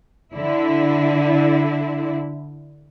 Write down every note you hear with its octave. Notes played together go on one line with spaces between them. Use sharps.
D3 E4